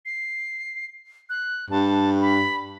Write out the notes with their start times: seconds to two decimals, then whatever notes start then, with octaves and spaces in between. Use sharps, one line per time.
0.05 C7
1.29 F#6
1.71 G2 A5
2.21 B5